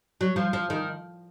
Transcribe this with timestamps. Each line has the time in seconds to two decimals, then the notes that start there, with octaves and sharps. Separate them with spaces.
0.21 F#3
0.36 F3
0.53 F3
0.70 D#3